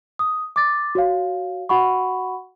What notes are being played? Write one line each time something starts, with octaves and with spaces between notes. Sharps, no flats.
D#6
D6 A6
F#4 C#5 F5
F#4 F#5 B5 C#6